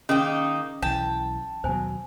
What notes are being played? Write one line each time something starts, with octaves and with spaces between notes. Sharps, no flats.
D#3 A#3 C#4 D#4 G#4 C6
B1 E3 G5 A5
D#2 B2 F#3 C5 G#5